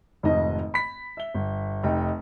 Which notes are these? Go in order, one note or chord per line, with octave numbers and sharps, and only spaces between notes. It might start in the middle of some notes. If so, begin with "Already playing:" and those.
F1 F2 G#2 D#3 D#5
B5 B6
E5 G7
G1
F1 D#4 G5